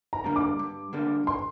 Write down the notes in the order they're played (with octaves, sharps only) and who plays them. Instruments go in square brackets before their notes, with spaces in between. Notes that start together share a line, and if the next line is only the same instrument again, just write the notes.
[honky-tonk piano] A#5
[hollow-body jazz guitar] D3 G3 A#3 D4
[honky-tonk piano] D6
[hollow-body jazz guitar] G2
D3 G3 A#3 D4
[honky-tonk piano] C6